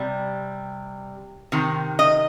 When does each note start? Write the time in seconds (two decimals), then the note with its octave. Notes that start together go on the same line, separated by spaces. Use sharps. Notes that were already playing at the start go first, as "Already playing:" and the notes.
Already playing: C3 G3
1.52 C3 D#3
1.99 D#5